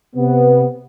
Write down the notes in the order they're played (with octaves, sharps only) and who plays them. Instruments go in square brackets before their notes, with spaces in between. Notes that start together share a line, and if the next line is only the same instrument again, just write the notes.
[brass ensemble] C3 B3